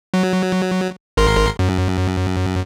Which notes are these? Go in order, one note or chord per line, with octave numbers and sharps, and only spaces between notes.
F#3
G#1 A#4 C6
F#2